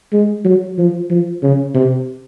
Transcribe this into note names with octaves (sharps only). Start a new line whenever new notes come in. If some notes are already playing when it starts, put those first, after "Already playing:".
G#3
F#3
F3
F3
C#3
C3